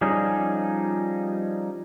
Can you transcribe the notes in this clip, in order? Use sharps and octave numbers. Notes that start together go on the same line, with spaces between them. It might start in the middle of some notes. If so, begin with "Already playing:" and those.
F3 G3 C#4 D#4 G#4